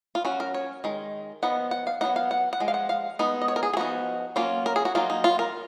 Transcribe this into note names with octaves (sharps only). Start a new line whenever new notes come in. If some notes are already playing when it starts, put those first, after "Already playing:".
F4
F#3 C#4 F#4
A#4
C#5
D#3 G#3
F3 B3 D#4 F#5
F#5
F5
F#3 B3 D#4 F#5
F5
F#5
F#5
F3 G#3
F5
F#5
F5
G#3 B3 D#4
D#5
C#5
A#4
G#4
G#4
F3 B3 D#4 F#4
F#3 A#3 C#4 F4
A#4
G#4
F#4
F#3 A#3 D#4 F4
D#4
F4
A#4